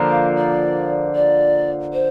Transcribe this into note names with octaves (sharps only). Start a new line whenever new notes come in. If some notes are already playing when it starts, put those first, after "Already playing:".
Already playing: D3 F3 A#3
F5
D5
D5
C5